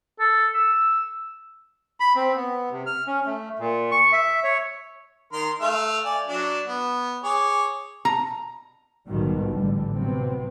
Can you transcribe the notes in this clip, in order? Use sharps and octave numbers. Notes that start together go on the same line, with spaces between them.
A4
E6
B5
C4
B3
C3
F6
C#4
A3
A#2
C#6
E5
C#5
D#3 A#4 C6
A3 F5 F6
D5 G#5
F#3 D4
B3
G#4 C#5 D6
A#5
B1 G#2 B2 D#3 F3 G3
A1 D3 G3
C3 F#3 B3 C4